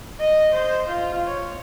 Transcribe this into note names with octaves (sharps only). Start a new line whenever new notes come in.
D#5
C5
F4
C#5